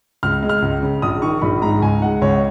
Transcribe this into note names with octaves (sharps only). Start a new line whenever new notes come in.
C#2 F6
G#3
F6
C#2
C#3
A#1 D#6
D#3 C#6
A#1 B5
G#2 A#5
C#2 G#5
G#3 F#5
C#2 C#5